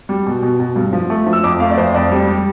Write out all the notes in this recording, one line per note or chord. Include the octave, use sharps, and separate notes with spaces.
G3
B2
B2
B2
G2
F3
A3
F3
E6
F2 D6
A3 F5
D5
F2 C5
F2 D5
G3
G3